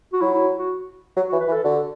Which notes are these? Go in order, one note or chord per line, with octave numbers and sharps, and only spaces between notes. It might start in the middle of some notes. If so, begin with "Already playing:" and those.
F#4
F#3 E4
E4
F#4
F#3
E3 F#4
B4
E3
A4
D3 F#4
A4